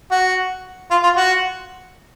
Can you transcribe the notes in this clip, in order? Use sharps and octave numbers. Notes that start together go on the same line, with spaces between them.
F#4
F4
F4
F#4